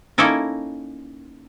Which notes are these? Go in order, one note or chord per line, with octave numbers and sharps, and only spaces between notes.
A#3 C#4 D#4 E4 A4 A#4